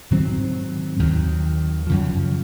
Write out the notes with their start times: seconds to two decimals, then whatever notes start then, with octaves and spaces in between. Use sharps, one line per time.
0.11 G#2 D#3 F#3 C4
0.99 D#2 D#3 F#3
1.87 F#2 C#3 F3